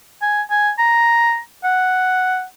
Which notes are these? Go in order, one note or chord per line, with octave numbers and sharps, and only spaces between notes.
G#5
G#5
A#5
F#5